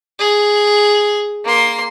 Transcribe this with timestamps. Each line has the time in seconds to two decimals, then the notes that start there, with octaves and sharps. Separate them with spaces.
0.19 G#4
1.45 A#3 C6